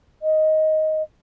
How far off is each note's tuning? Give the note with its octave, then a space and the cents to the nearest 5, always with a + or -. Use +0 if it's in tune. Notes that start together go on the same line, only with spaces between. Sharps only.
D#5 +10